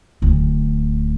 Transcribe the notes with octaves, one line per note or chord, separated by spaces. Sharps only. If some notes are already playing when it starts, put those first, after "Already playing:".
D1 D2